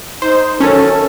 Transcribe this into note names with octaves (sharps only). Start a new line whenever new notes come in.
D#4 C5
F#2 D#3 C#4 A4